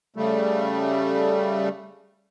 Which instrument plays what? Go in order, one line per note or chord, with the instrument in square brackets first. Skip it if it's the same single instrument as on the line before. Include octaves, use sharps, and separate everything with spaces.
[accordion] C#3 G3 A3